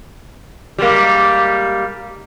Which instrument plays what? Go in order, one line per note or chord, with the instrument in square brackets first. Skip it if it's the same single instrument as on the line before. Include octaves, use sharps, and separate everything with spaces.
[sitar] G3 G#3 A#3